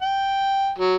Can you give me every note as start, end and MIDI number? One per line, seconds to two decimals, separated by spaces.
0.02 0.70 79
0.78 0.96 54